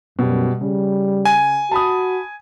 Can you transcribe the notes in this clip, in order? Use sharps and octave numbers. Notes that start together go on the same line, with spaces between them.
F#2 B2 G3
C#3 G3
G#5
F#4 A5 B5 D#6